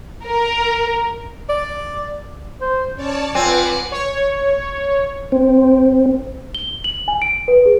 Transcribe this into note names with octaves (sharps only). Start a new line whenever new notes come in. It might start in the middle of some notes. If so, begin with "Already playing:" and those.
A#4
D5
C5
C#4 C#5 D5 A5
C4 F4 B4 F#5 G#5 D6
C#5
C4
G7
F#7
G#5
D7
B4
G#4